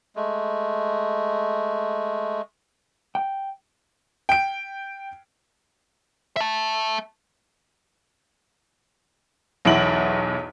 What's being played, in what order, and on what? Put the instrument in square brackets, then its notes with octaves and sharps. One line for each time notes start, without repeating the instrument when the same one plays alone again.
[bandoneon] G#3 A3
[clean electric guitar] G5
[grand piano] G5 D7
[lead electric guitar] E5 A5
[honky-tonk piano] B1 E2 E4 D7 F#7